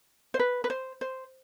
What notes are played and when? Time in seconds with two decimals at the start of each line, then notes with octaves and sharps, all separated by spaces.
0.34 C5
0.39 B4
0.64 B4
0.70 C5
1.01 C5